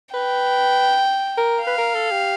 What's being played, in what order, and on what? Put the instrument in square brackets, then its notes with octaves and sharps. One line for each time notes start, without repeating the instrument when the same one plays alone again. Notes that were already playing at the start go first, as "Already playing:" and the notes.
[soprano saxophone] B4 [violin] G5
[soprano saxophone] A#4
[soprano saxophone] B4 [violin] F5
[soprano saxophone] A#4
A4
G4